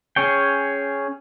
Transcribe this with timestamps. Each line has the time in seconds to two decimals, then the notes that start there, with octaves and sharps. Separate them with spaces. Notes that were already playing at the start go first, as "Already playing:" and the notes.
0.16 C#4 G#4 C#5 G5